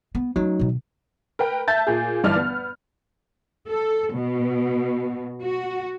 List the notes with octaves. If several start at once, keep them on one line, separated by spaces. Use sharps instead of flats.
B3
F#3 A3 C#4 D#4
B2 D#3
A#4 B4 G5
E5 A5 G6 A6
A#2 G#4
G1 G2 E3 D5 F6
B3
A4
B2
F#4